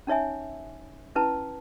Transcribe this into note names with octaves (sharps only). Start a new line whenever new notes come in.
C#4 D#4 C#5 E5 G#5
C#4 E4 B4 A5